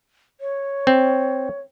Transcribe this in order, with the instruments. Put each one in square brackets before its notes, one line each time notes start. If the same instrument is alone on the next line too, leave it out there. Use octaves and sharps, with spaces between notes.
[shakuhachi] C#5
[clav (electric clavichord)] C4